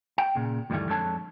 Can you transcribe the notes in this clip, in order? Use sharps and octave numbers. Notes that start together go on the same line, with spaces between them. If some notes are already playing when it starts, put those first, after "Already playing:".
G5
A#2 C#3
D2 G2 D#3 E3 G3 A3
F2 G#3 D4 A4 C#5 A5